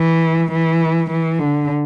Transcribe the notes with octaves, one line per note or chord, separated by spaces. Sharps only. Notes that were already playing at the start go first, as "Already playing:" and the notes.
Already playing: E3
E3
E3
D3